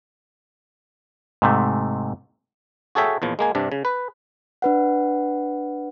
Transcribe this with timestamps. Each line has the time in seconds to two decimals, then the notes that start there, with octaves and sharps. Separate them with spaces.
1.42 G#2 C3 A3
2.95 F#4 G#4 A4 C#5 E5 G5
3.22 E2 A#2 F3
3.39 G#3 A#3 G#5
3.55 G2 C3 D4
3.72 C#3
3.85 B4
4.62 D4 B4 F#5